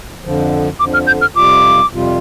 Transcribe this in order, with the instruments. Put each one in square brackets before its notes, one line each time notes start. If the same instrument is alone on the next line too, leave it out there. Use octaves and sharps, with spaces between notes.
[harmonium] F2 D3 F3
[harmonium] F2 D3 F3 [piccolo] D6
[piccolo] F6
G6
F6
[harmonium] F2 C3 G3 F4 [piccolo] D6
[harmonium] F2 C3 G3 F4